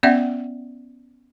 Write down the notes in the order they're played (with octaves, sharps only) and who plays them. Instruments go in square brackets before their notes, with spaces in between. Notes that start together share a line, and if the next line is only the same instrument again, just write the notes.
[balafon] B3 C#4 D5 E5 F#5